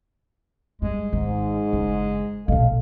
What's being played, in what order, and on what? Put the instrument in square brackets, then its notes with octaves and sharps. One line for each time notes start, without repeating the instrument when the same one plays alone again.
[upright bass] G2 [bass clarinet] G#3
[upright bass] G#1 [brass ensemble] G#2
[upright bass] F#1
[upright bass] A#1 B2 [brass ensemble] A4 D#5 F5